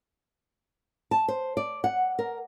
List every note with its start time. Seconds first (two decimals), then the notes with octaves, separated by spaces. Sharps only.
1.11 A5
1.28 C5
1.57 D5
1.84 F#5
2.19 A#4